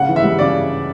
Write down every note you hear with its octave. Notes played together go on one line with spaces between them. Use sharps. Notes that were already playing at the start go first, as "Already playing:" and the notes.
Already playing: C#3 F#5
E3
E5
G3
C#3 D5